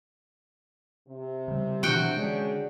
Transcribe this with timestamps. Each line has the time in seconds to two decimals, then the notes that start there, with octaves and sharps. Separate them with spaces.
1.08 C3
1.48 C#3 G3
1.83 B2 E3 D4 F#4 G5
2.17 D3 G#3 C#4 D4 G#4